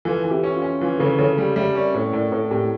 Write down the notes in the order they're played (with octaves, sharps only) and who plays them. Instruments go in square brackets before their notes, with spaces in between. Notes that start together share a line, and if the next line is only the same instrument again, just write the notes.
[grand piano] E3 [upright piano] F4 A4
[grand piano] E3
[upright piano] E4 G4
[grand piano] C#4
[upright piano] F4
[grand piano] C#4
[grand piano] E3 [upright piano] F4
[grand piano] C#3 [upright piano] A4 C#5
[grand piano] C#3 [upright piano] A4 C#5
[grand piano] G3
[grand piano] G3 [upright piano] C#5 E5
[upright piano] E5
[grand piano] C#4 [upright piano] A#4 D5
[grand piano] A2 [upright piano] A4 C#5
[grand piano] A2 [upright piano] A#4 D5
[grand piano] A2 [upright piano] A4 C#5
[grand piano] A2 [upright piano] G4 A#4